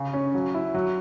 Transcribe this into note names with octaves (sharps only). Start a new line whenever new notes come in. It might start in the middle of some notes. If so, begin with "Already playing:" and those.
Already playing: C#3
C#4
F#3
E4
F#3